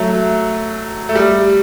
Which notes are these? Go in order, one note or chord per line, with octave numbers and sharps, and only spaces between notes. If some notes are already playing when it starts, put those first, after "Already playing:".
Already playing: F#3 A3
A3
G3